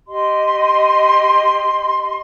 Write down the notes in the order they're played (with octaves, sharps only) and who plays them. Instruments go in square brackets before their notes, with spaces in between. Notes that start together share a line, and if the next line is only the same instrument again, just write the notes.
[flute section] G4 D#5 C6